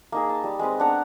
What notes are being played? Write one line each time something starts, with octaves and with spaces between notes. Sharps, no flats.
A#3 D#4 G#4
A5
G3
G#3 C4 B4
B3 D4 F#5 A#5